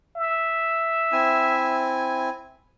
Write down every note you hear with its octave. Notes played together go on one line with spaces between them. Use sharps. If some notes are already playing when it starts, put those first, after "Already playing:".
E5
C4 E4 G#5